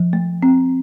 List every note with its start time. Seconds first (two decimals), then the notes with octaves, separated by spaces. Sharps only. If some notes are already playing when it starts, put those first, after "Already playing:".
Already playing: F3
0.13 A3
0.43 C4